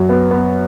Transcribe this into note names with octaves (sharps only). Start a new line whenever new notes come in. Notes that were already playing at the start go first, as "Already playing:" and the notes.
Already playing: F#2 F#3
B3
B3